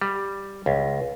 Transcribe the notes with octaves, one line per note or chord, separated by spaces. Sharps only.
G3
C#2